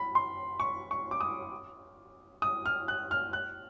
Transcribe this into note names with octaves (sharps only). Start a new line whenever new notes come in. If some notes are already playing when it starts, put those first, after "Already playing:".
Already playing: B5
C6
C#6
C#6
D6
D#6
D#6
F6
F#6
F6
F#6